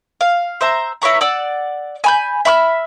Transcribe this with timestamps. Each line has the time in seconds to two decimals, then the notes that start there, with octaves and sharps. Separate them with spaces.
0.21 F5
0.61 C5 E5 A#5
1.02 E4 B4 C#5 A#5
1.21 D5 F#5 E6
2.04 G#5 B5 G6
2.45 E5 B5 C#6 F6